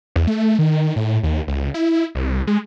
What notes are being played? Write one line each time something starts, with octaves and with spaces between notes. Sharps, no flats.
E2
A3
D#3
A2
D#2
C#2
E4
C2
G#3